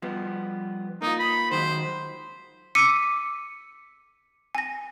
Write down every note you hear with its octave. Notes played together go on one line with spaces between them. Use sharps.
F3 G3 B3
A#3 D#4 F4
B5
D#3 F#3 G#3 C5
D6 E6 B6 C#7 D#7
G#5 A#6